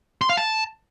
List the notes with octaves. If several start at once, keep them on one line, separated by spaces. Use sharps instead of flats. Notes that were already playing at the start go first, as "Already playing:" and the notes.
C6
F5
A5